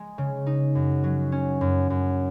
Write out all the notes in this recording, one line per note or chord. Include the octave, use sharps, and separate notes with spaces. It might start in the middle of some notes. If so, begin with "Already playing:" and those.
Already playing: G#3
C#3
D#4
F#2
F#3
C#4
F#2
F#2